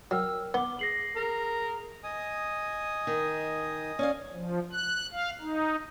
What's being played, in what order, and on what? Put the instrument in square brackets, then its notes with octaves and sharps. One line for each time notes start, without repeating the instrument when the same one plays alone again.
[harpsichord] F#3 [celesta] A#4 G5 F6 [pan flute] E6
[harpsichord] B3 [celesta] F#5 G7 [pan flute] D6
[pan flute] G#4 [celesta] A#6 C7 F#7
[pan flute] G#4 [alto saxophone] A#4
[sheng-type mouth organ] D#5 G#5 D#6
[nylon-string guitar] D#3
C#4 D5 F5
[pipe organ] F3
F#6
F5
D#4